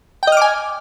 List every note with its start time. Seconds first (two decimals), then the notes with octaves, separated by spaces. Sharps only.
0.23 G5
0.27 D#5
0.32 F6
0.37 D6
0.42 G#5